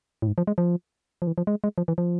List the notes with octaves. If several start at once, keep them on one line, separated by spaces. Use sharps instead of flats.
A2
G#2
F3
G#3
F3
F3
E3
F3
G#3
G#3
F3
E3
F3